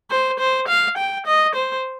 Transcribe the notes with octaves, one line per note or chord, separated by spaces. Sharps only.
C5
C5
F5
G5
D#5
C5